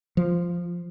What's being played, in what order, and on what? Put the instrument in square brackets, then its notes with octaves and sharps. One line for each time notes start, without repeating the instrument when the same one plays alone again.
[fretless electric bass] F3